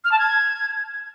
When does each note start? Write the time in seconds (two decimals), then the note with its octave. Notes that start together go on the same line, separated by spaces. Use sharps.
0.04 F6
0.12 A5
0.19 G#6